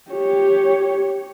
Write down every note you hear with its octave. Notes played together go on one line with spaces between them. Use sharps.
G4 C#5